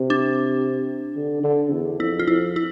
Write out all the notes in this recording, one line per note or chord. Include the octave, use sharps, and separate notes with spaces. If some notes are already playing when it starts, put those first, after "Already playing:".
Already playing: C3
D4
D3
D3
E2
F2 E4
F4
F2 E4
E4